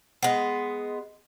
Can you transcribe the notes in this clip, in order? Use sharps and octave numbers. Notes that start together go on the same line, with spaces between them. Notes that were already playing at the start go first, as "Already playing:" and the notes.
G#3 B3